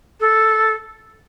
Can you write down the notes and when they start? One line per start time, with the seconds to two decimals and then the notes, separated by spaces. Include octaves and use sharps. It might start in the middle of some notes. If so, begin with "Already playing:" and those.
0.20 A4